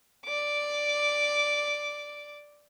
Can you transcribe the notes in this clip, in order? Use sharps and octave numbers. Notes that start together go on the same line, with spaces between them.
D5 D6